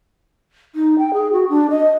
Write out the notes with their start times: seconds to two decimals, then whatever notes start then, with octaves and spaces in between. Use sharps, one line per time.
0.75 D#4
0.98 G5
1.14 G#4
1.32 F#4
1.50 D4
1.70 D#5